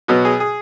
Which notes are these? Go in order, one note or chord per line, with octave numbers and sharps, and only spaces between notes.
B2 F#3 B3 F#4
G#4
G#4